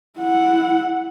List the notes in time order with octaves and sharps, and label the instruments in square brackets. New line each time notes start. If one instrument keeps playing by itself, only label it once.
[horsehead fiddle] E4 F#5